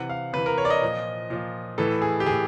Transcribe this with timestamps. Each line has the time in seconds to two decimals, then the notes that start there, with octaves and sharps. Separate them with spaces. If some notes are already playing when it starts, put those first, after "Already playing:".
Already playing: C3 E3 F#5
0.09 F5
0.33 C3 E3 B4
0.46 A#4
0.58 C#5
0.65 D5
0.70 D#5
0.81 A#2 F3
1.30 A#2 F3
1.78 A2 E3 A4
2.02 G#4
2.20 G4
2.26 A2 E3 G#4